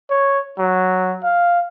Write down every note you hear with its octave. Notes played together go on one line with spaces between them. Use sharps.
C#5
F#3
F5